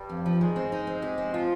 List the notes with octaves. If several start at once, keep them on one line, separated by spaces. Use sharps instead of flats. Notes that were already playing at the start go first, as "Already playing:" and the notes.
Already playing: G2 G3
F2
F3
G#2 D#3 G#3
C4
D#4
C4
G4
C4
F3 F4